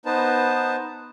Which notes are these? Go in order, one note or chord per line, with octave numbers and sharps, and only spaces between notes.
B3 D#4 B4 C5 A5